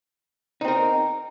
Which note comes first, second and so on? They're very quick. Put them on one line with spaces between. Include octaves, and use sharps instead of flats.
D#4 C4 A#4